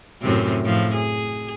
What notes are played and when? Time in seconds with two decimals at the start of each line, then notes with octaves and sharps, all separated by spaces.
0.21 F#2 A2 C3
0.65 A2 F3
0.94 G#4